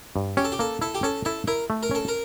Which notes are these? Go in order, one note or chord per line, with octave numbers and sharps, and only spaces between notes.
G2
C#4 G4
A4
G4
A#3 A4
E4 A4
G4
C#4 A4
E4 A4
E4 A#4
A3
A#4
C#4 A4
A#4